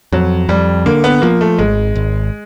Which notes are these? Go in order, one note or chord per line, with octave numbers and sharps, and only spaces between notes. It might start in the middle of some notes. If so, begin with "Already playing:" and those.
F2 F#3
F2 G3
D3 A#3
B3
F3 A#3
A3
G#1 G#3
G#1